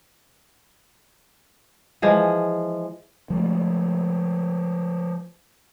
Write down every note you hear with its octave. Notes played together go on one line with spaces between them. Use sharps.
E3 F3 G#3
F3 G#3 A3